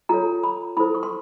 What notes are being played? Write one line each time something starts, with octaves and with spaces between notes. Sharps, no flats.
F4 A4 C#5 A#5
B5
E4 A4 C5 B5
C#6
C6